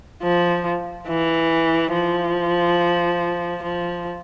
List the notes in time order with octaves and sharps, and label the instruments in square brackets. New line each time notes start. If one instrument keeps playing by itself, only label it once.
[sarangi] F3
E3
F3
F3